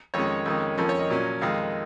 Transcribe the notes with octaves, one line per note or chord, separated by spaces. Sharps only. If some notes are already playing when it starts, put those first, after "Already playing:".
F2 D#3 G#3 C#4 C#5
F2 D#3 G#3 C#4
F2 F3 A#3 C#4
C#5
D#5
A#2 F#3 C#4
F2 D#3 G#3 F5